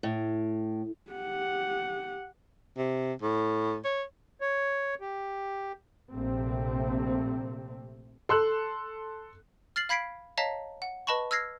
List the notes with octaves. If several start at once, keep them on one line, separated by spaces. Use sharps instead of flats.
A2
G4 F#5
C3
A2
C#5
C#5
G4
A#1 C3 A3 C4
A4 C6 E6 F#6
F6 A6 C7 F#7
F5 B5 G#6 B6 C7 D7
C#5 D#5 F5 A5 A#5 B6
F#5
B4 D#5 A5 B5 C#6
E6 F6 G#6 A#6 C7